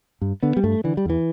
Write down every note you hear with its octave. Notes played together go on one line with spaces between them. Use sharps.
G2
D3 B3
G3
G2 A3
D3 E3
G3
E2 E3